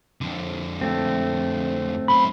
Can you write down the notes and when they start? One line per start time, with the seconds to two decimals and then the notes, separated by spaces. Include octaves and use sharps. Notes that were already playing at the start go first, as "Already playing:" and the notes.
0.21 F2 D3
0.81 A3 C4
2.08 B1 B5 C6